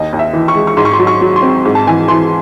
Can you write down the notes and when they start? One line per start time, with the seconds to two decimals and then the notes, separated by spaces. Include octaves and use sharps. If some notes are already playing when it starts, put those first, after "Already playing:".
Already playing: D#2 D#5
0.13 D#2
0.19 E5
0.33 E3
0.48 C#6
0.55 G#3
0.67 C#6
0.77 G#2 C6
0.85 C#6
0.93 C6
0.99 F#3
1.07 C#6
1.21 F#3
1.36 C6
1.42 C4
1.65 G#2
1.75 A5
1.87 E3 G#5
2.08 E3 C6